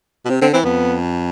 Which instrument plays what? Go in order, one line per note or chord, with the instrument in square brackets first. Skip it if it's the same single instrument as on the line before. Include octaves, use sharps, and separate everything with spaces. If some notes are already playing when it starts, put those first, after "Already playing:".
[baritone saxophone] B2
[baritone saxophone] C3 [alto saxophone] C4
[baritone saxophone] D3 [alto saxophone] C4
[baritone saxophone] E3 [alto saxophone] C4
[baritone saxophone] F2 [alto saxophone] B3